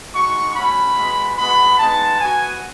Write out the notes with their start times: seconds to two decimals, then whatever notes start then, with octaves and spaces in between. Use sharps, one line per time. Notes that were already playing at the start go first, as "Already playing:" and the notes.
0.13 G#3 D#4 F#4 C#6
0.54 A3 C#4 F#4 B5
0.97 G#3 B3 F#4
1.37 G#3 B3 F#4 B5
1.78 G#3 B3 D#4 A5
2.20 B3 F#4 G#5